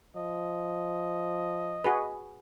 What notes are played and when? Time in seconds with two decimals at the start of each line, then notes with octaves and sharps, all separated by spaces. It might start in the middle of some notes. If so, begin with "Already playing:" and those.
0.16 F3 D#5
1.84 F#4 G#4 B4